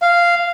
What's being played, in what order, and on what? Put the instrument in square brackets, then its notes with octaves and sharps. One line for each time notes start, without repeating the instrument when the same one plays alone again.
[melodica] F5